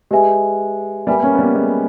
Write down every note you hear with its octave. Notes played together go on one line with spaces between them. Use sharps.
G#3 G4 B4 E5 G#5
G3 A#3 B4 E5 G#5 B5
A#3 C#4
B3
G3 A#3
G#3 B3